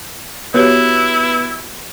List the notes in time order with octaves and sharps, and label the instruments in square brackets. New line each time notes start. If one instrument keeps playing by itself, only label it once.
[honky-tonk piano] B3 [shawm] E4 [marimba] F#4 G4 C#5